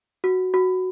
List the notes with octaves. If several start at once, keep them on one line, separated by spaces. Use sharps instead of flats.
F#4
F#4